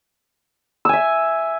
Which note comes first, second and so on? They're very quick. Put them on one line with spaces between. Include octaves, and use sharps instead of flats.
E6 G#5 E5